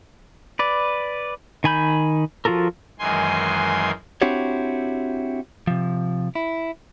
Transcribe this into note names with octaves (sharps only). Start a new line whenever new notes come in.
B4 D5
D#3 G#5 B5 G6
F3 F4 F#4 A4 A#4
F#2 D#3 E3 G#3 G#5 C6
C4 D4 E4 F#4 G4 C#5
C3 F3
E4